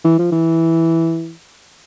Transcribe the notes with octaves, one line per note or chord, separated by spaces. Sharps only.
E3
F3
E3